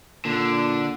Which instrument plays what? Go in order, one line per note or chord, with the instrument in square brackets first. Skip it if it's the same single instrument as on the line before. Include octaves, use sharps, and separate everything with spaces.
[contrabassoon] A#2 [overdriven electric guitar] D3